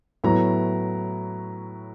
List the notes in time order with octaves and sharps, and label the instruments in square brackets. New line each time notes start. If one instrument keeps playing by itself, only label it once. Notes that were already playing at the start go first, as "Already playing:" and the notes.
[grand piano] A2 F#3 B3 E4 A#5